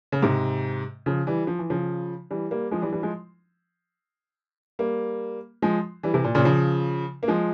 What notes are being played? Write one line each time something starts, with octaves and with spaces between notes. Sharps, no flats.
C#3
G#2 C3
C#3 F3
E3 G3
F3
E3
C#3 F3
E3 G3
G3 A#3
F3 G#3
E3 G3
E3 G3
F3 G#3
G3 A#3
F3 G#3
E3 G3
C3 E3
A#2
A#2 C#3
C#3 F3
A#3
F3 G#3